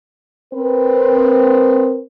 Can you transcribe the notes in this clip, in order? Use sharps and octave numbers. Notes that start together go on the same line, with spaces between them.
C4 A#4 B4